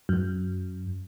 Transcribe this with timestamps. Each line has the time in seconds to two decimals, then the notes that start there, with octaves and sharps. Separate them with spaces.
0.09 F#2